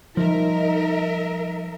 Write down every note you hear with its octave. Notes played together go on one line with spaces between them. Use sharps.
F3 G3 D#4 A#4 E5